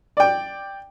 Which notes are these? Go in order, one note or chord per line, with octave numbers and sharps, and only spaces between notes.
D5 G5